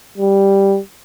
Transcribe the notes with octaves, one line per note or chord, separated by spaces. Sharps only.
G3